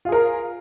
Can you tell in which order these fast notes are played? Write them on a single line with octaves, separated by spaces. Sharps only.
F4 G#4 A#4